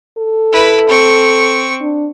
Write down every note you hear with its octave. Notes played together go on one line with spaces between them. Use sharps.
A4
E4 B4
C4 C#6
D4